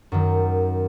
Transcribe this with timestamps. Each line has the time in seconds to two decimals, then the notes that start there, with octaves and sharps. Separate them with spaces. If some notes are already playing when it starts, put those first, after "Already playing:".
0.12 F#2 D#3